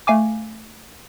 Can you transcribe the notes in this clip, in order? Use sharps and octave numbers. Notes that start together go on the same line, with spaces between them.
A3 F5 G#5 D6